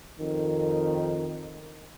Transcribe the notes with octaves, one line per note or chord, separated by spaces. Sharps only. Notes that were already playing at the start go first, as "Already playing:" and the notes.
F2 D#3